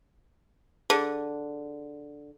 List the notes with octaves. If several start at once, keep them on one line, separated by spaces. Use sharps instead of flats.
D3 G#4